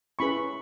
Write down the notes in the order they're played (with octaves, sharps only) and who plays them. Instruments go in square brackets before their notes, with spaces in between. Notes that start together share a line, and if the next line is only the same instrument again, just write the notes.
[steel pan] C#4 E4 G#4 B4 B5 C#6